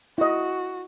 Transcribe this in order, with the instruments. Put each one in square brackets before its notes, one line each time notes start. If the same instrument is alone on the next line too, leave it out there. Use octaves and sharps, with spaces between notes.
[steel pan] E4 D#5 [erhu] F#4